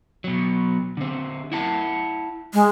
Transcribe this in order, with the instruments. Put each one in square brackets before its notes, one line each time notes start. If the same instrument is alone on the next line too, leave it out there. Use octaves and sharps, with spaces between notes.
[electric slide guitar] B2 F#3
D3 C4
E4 F#5 A5
[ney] G#3